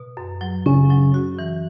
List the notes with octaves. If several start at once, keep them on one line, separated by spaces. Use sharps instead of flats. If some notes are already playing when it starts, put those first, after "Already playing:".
Already playing: B2
F#2
F#3
C#3 C#4
F#3
F#4
E3